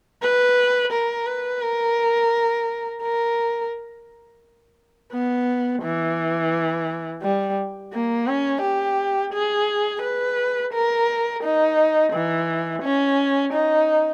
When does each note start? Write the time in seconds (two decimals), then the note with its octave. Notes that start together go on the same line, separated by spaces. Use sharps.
0.22 B4
0.92 A#4
1.27 B4
1.62 A#4
3.02 A#4
5.12 B3
5.82 E3
7.22 G3
7.93 A#3
8.27 C#4
8.62 G4
9.33 G#4
10.02 B4
10.73 A#4
11.43 D#4
12.13 E3
12.82 C#4
13.53 D#4